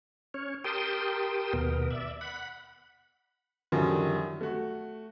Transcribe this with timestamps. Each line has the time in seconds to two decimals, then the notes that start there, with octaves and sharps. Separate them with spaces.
0.34 C#4 C#5
0.64 G4 A#4 G5 A5 C6 D#6
1.53 D#2 B2 B3 A#4
1.91 D5 E5
2.21 F#5 B5
3.72 F#2 D3 D#3 F3 G3
4.41 A3 F#4